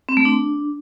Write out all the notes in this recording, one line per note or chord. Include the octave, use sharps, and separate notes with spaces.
C4
A3
D4